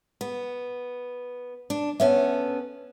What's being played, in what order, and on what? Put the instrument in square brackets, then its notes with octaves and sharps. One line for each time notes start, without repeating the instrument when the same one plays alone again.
[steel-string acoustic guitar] B3
D4
[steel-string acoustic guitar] B3 C#4 A4 [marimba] C#5 E5